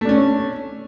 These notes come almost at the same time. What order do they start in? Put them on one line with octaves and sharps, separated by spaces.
A3 D4 C#4